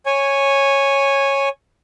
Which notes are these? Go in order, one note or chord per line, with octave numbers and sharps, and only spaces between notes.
C#5 G#5